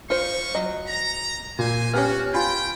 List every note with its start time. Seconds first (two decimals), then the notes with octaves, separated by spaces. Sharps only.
0.10 G3 D#4 F4 C5 C#6
0.55 F#3 D#5
0.87 A#5
1.59 A#2 C5 G#5
1.94 B3 C#4 F#4 G4 G#5 F6
2.34 F4 G5 G#5 B5